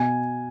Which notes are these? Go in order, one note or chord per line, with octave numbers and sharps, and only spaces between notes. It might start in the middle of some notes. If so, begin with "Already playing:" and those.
Already playing: B2 G#5